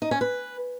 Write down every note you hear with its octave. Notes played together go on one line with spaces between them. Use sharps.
D#4
C#4
B4